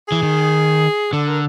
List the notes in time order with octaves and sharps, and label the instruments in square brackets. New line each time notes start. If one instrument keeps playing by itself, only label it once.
[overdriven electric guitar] E3 [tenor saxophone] G#4
[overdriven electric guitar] D#3
[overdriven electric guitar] D3 [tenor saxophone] A4
[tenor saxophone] A#4